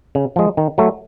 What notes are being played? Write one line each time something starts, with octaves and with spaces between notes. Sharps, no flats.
C#3
F3 G#3
D#3
F#3 A3